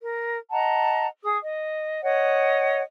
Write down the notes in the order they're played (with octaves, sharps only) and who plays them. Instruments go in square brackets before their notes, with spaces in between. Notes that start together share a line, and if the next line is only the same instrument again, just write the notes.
[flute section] A#4
D#5 F#5 A5 A#5
G#4 D#6
D#5
C#5 D#5 F#5